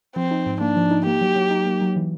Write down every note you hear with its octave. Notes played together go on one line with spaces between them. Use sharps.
F3 C4
D#4
G#2
A#3 D4
F3
D#4
A#3 G4
F#3
F#3
D#4
A#3
F#3
E3